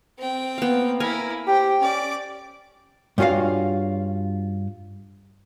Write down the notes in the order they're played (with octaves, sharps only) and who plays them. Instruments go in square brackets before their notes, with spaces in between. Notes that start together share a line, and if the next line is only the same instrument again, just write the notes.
[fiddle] C4 G5
[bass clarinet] A#3 [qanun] B3 F5
[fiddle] E4 [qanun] A#4 F5 G#5
[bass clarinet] G4 [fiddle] C5 [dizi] G5
[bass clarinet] C#4 [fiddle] D5 D6
[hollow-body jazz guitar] G2 C#4 F4 F#4 F5